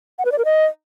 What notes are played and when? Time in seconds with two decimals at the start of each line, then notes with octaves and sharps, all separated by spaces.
0.19 F#5
0.25 B4
0.32 D5
0.38 A#4
0.45 D#5